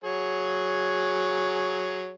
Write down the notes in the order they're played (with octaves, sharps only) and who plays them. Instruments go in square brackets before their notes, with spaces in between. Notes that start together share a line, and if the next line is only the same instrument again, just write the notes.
[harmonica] F#3 G#4 C#5